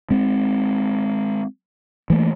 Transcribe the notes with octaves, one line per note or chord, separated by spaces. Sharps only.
G#3 C4
E3 A3 A#3